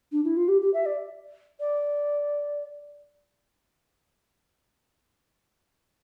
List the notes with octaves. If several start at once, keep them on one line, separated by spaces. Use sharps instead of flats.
D4
E4
F4
G4
G4
E5
D5
D5